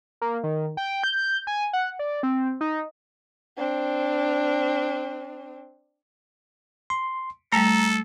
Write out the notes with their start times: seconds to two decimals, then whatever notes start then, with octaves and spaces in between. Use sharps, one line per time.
0.21 A#3
0.44 D#3
0.77 G5
1.04 G6
1.47 G#5
1.73 F#5
1.99 D5
2.23 C4
2.61 D#4
3.58 C4 D4
6.90 C6
7.52 G3 A3 A4 A#5